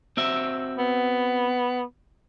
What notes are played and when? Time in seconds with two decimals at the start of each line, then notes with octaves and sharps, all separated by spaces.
0.17 C4 F#4 E5
0.78 B3